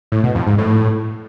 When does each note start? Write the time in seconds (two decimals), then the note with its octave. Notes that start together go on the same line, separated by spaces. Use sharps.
0.12 A2
0.23 B2
0.35 F2
0.47 G#2
0.58 A2